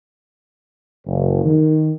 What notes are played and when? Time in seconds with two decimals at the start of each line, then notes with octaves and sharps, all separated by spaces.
1.06 F#1
1.45 D#3